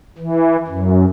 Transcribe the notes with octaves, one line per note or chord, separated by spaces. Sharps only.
E3
F#2